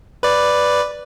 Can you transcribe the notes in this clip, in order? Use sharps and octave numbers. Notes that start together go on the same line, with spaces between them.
B4 D5